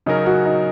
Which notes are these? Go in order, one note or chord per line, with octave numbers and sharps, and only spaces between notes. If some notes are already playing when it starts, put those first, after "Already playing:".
C#3 F#3 C#4 D#4 A#4
F#4
D#4